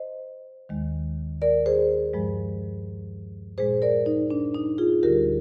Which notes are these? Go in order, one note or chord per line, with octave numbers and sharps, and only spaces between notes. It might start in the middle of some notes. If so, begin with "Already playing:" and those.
Already playing: C5 D#5
D#2 D#3 G#3
A#4 D5
G#4 C5
G2 F3 G#3
A#2 G#3 G#4 C5
A#4 D5
D#4
D4
D#4
F4 G#4
D2 D3 G3 G4 A#4